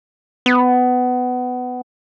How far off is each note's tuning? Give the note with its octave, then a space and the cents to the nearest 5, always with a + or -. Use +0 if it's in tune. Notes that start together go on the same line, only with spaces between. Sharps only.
B3 +20